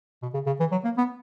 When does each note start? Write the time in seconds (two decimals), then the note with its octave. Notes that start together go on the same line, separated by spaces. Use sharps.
0.23 B2
0.34 C#3
0.46 C#3
0.60 E3
0.72 F#3
0.84 A#3
0.97 B3